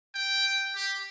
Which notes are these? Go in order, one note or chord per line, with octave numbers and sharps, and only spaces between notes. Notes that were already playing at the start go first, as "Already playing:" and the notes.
G5
G4